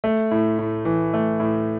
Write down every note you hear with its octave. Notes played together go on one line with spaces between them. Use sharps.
A3
A2
A2
E3
A3
A2